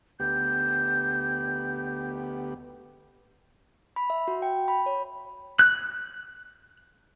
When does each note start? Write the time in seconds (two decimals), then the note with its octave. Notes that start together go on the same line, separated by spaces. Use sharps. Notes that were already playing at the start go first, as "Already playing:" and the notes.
0.20 D2 B3 G4 G6
3.96 B5
4.10 E5
4.28 F#4
4.42 G5
4.68 B5
4.86 C#5
5.59 F#6